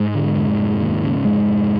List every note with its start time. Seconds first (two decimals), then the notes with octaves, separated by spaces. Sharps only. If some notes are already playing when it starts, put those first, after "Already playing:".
Already playing: G#2 G#3
0.15 D3
0.36 F1
0.58 F1
0.80 D#2
1.03 C#3
1.24 F1 G#2 G#3
1.46 F1